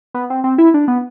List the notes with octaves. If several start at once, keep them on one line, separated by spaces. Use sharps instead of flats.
B3
C4
C4
E4
D4
B3